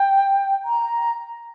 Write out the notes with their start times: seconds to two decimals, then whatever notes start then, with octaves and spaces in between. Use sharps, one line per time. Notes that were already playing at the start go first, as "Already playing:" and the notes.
Already playing: G5
0.65 A#5